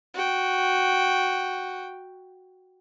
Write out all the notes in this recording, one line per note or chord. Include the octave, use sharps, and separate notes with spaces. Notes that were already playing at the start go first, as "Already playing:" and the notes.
F#4 G5